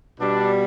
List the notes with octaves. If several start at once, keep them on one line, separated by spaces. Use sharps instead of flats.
B2 G3 D4